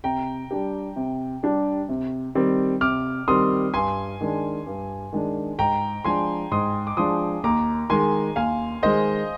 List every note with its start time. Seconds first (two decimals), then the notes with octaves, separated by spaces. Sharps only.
0.04 C3 G5 A#5
0.51 G3 D4 G4
0.96 C3
1.43 G3 D4 G4
1.89 C3
2.35 D#3 G3 C4
2.81 C3 D6 F6
3.28 D#3 G3 C4 C6 D#6
3.74 G2 G#5 C6
4.21 D#3 G#3 D4
4.66 G2
5.13 D#3 G#3 D4
5.59 G#2 G5 A#5
6.05 F3 G#3 D4 G#5 C6
6.51 G#2 C6 D#6
6.87 D6
6.97 F3 G#3 D4 C6 D#6
7.44 D#2 A#5 D6
7.90 D#3 G#3 G#5 C6
8.36 D#2 F5 G#5
8.82 D#3 G#3 C5 D#5